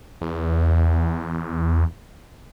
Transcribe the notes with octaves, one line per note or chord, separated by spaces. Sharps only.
E2